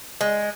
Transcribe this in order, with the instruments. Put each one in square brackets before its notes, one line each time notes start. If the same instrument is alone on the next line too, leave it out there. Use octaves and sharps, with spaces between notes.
[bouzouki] G#3